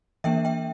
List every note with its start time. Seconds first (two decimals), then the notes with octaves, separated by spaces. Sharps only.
0.24 E3 A#3 D4 E5 G5
0.45 E5 G5